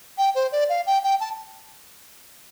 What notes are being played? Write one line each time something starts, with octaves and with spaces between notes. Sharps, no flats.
G5
C5
D5
F5
G5
G5
A5